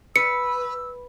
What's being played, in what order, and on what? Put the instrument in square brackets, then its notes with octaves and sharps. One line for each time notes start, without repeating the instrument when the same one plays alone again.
[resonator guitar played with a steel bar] B4 [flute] E6 [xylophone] C#7